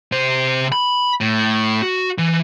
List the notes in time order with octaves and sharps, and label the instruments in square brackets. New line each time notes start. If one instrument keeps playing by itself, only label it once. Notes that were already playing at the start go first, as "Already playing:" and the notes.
[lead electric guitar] C3 C5
B5
A2
F#4
E3